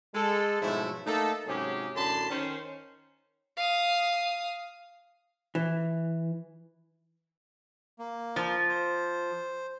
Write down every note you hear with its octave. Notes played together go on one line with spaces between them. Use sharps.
G#3 A4
G#2 B2 F3 F#3 A3 E4
A3 A#3 D#4 A4
G#2 C3 F#3 C#4 G4 G#4
F#2 A2 D3 A5 B5 C6
D#3 C#4 C5
F5 D#6
E3
A#3
F3
C5